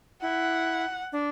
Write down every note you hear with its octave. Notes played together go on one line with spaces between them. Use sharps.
E4 F#5
D4